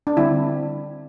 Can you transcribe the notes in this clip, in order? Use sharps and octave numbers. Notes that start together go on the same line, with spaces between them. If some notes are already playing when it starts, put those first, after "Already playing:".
D4
D3 G3 C4 E4